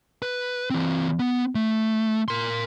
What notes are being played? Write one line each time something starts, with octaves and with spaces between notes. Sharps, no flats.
B4
E3 C4
B3
A3
A#4 C6